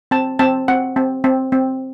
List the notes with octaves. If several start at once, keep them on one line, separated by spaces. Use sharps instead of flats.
C4 A5
C4 A5
C4 F#5
C4
C4
C4